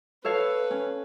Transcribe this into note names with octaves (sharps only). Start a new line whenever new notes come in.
A4 B4 C#5 F5
C#4